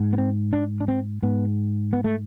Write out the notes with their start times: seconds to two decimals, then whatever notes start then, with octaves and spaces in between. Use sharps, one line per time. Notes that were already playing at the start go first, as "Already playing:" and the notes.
Already playing: G#2
0.13 B3
0.18 C4
0.53 D4
0.81 D4
0.88 C4
1.23 G#2 B3
1.93 B3
2.04 A3